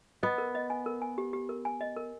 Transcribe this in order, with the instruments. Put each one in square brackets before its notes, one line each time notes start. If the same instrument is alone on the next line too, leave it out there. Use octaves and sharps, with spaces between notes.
[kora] B3 [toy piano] D#5
[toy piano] A#4
D#5
G#5
A#4
G#5
G4
G4
A#4
G#5
D#5
A#4